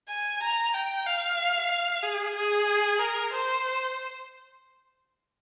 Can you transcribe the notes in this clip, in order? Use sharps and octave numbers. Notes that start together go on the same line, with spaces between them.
G#5
A#5
G5
F5
F5
G#4
G#4
A#4
C5